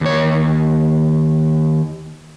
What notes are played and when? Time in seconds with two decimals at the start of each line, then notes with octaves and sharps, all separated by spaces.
0.01 D#2 C#5